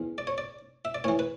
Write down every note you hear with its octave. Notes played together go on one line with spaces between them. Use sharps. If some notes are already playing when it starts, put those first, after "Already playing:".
Already playing: E2 C#3 E3
D5
C#5
D5
E5
D5
A2 E3 C#5
B4